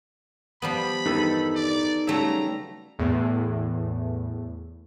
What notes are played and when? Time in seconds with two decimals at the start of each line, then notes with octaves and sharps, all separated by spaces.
0.62 F3 G3 B3 B5
1.06 E2 G2 D#3 D#4 A4 B4
1.56 D5
2.07 C#3 F#3 G3 A3 E5 A#5
2.99 E2 A2